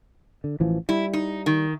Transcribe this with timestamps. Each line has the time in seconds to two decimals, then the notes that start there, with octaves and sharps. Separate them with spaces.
0.44 D3
0.60 A1 E3 F3
0.89 G3 E4
1.13 D#4
1.46 D#3